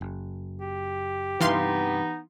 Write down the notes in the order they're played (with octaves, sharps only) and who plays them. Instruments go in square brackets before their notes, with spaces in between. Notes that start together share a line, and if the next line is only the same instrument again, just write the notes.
[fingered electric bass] F#1
[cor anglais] G4
[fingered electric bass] G2 C3 [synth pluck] E3 F5 C6 [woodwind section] B3 D#4